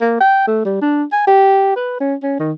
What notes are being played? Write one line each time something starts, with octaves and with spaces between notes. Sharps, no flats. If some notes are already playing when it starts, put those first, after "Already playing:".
A#3
G5
A3
G3
D4
G#5
G4
B4
C#4
C#4
D#3